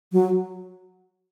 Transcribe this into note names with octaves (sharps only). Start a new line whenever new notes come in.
F#3